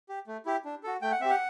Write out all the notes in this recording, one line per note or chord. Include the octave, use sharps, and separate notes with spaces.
G4
A3
E4 G4
D4
F#4 A4
A3 G5
F#5
C4 G4 E5
F#5